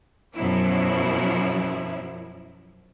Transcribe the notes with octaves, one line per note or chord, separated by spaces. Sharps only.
F#2 B2 F3 F#3 E4